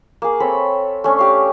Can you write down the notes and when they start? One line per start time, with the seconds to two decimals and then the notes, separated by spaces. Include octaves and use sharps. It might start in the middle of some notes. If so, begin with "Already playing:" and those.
0.22 A#3 G#4
0.40 C4 A4 C#5 B5
1.04 A3 C#4 D4
1.19 G4 F5